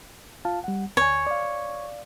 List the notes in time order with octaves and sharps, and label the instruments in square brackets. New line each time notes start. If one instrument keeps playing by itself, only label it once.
[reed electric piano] F4 F5 A5
G3 F#5
[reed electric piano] D2 G#5 [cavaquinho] C#5
[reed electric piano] D5 F5